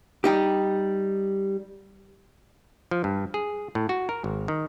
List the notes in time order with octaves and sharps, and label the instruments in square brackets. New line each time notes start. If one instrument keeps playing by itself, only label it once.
[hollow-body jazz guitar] G3 D#4 G4
[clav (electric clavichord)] F3
G2
G#4
A2
F#4
A#4
G#1
D#3